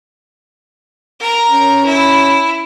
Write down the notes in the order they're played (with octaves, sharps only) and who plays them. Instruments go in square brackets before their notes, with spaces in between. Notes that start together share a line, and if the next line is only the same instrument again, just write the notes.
[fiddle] A#4 A#5
[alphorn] C#4
[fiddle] E4